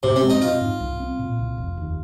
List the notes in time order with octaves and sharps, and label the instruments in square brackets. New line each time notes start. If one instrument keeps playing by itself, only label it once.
[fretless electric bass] G#2 [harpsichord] C3
[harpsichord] C4
[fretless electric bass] G#3
[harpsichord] D#4
[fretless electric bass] C4 [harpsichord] F4
[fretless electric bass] G#2
C2
C4
A#2
C2
F1
D#2